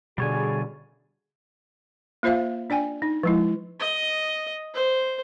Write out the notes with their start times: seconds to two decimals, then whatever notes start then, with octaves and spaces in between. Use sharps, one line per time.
0.18 B2 D3 G3 G#4 C#5 D5 G#5
2.23 A#3 F4 C5 E5 F5
2.70 D4 D5 G5 G#5
3.02 D#4
3.23 F3 G#3 E4
3.80 D#5
4.74 C5